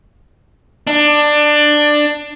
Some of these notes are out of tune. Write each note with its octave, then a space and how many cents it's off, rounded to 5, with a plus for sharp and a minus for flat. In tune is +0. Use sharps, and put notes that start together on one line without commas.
D4 +15